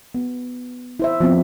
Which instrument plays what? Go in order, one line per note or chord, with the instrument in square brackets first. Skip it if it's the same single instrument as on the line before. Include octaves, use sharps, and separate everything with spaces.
[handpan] B3
E4 C5 E5
F3 B3 C4